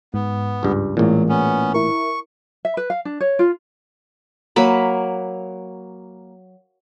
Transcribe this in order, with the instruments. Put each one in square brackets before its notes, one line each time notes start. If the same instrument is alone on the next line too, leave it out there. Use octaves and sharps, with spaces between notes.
[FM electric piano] G#2 [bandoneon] B3
[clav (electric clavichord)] C#2 G2
[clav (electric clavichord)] A1 A#2 [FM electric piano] E3 G#3 [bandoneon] F#3
[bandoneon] B3 C#4
[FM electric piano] E4 A#4 [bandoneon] C#6
[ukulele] E5
B4
F5
D4
C#5
F4
[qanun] F#3 A#3 B5